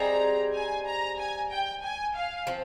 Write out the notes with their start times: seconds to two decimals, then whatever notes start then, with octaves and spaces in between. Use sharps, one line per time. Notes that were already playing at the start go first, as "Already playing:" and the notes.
Already playing: G3 C4 D#4 G#4 A#5
0.54 G#5
0.86 A#5
1.18 G#5
1.50 G5
1.82 G#5
2.15 F5
2.47 F3 C4